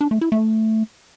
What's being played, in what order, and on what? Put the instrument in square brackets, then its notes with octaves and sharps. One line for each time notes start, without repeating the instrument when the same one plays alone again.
[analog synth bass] D4
A3
E4
A3